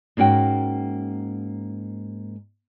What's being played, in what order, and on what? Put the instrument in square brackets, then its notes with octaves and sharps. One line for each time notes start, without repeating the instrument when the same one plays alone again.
[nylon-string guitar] G#2 A#3 C#4 F#4 G5